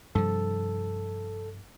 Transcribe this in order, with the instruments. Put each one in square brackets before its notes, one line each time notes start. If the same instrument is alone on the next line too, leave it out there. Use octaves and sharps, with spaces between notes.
[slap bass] G2 C3 F3 [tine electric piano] A4